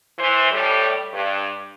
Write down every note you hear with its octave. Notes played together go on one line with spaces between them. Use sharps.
E3 C5
A2 G3
G2